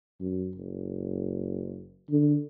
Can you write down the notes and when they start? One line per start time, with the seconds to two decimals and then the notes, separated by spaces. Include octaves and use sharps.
0.20 F#2
0.56 F#1
2.10 D3